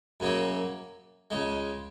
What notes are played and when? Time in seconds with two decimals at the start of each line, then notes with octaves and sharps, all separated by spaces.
0.20 F#2 C#3 F#3 A#3
1.30 C#2 C#3 G#3